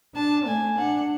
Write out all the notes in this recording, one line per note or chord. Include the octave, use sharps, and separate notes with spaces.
D4 A5
A3 G#5
D4 F#5